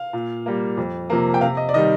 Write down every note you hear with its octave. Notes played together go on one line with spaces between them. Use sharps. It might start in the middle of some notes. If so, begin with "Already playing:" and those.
Already playing: F5
A#2
G3 A#3
F2
C3 F3 A#3
G5
C3 F5
D#5
D5
D#3 G3 D#5